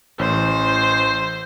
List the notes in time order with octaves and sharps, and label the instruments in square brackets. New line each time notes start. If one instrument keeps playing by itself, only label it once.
[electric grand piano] A1 [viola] C5